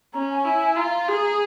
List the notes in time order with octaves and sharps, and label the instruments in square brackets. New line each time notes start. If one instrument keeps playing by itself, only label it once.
[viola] C#4 [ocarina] A#5
[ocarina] G#5
[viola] E4
[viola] F4 [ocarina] A#5
[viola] G#4